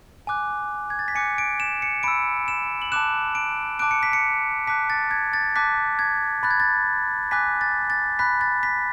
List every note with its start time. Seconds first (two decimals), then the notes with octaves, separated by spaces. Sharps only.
0.27 G#5 D6 F#6
0.90 G#6
0.99 A6
1.08 B6
1.15 G#5 D6 F#6 C#7
1.38 D7
1.60 E7
1.82 C#7
2.03 B5 E6 D7
2.48 E7
2.82 F#7
2.92 A5 D6 F#6 E7
3.35 D7
3.79 A5 D6 F#6 D7
3.91 C#7
4.03 B6
4.13 C#7
4.67 A5 D6 F#6 B6
4.90 A6
5.11 G#6
5.33 A6
5.56 A5 D6 F#6 B6
5.99 G#6
6.43 B5 F#6 A6
6.51 G#6
6.60 A6
7.31 G#5 D6 F#6 B6
7.61 A6
7.90 A6
8.19 B5 F#6 B6
8.41 A6
8.63 B6